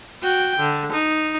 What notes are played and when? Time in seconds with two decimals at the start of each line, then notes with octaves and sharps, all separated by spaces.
0.22 F#4 G5
0.59 D3
0.92 D#4